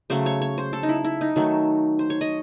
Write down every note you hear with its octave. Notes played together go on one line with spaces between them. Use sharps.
C#3 F#3 A3 C5
C#5
C#5
C5
A4
D#4
E4
E4
D#4
D#3 F#3 A3 A4
C5
C#5
D#5